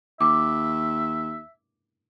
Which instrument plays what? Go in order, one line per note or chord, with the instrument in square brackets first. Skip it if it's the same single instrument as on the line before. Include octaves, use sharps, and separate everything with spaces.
[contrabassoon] D#2 [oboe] E5 [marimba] D6